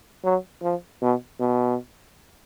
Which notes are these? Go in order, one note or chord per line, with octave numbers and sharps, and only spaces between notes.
F#3
F3
B2
B2